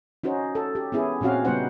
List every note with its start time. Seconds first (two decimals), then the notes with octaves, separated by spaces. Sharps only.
0.24 C#4 D#4 F#4 C5
0.55 A4
0.75 G4
0.92 B3 C#4 E4 G#4
1.21 A#2 C4 C#4 F#4 F5
1.45 C#3 G3 B3 D#4 C5 F#5